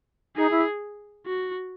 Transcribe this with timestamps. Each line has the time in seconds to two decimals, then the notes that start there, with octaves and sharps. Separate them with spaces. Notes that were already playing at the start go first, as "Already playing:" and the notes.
0.36 D#4 G#4
0.50 E4
1.26 F#4